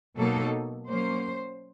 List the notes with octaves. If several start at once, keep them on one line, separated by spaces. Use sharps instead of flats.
B2 F#3 A#3 D#4 A4
F#3 A#3 C#4 C5